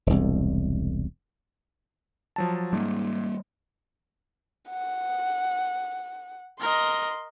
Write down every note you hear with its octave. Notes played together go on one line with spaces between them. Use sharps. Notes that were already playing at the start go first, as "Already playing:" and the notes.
E1 C2
F3 F#3 A5
G#2 G3 A#3
F#5
A#4 D#5 C6